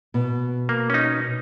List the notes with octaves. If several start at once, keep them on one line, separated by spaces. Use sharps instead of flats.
B2
A#3
C#4 D#4